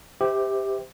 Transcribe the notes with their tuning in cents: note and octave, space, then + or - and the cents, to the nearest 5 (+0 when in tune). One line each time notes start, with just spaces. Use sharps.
G4 +10 C5 -30 E5 -25